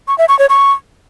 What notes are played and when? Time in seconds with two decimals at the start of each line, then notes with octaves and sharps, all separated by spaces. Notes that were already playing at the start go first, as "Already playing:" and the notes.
0.08 C#6
0.18 E5
0.29 C#6
0.39 C#5
0.49 C#6